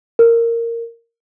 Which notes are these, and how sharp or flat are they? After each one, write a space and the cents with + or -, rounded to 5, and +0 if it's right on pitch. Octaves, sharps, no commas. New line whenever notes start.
A#4 -10